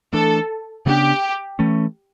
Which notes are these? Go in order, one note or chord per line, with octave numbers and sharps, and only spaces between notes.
E3 A3 D4 A4
C#3 G3 B3 D4 G4
E3 A3 C#4